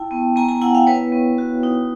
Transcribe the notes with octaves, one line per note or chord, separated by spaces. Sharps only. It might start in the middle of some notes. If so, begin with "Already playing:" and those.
Already playing: E4 G5 A5
B3
B3 G#5 A#5
G#5 A#5
E4 F#5 G#5
F5 G5
B3 B4 C#5
B3
F#4
D#4